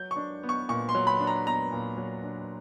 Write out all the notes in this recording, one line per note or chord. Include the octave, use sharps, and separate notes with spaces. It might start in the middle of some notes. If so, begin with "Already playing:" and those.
Already playing: F#3 G6
C#6
D4
B3
C#6
A#2 C#6
C6
F#3
B5
D4
A#5
B3 A#5
A#2
F#3
D4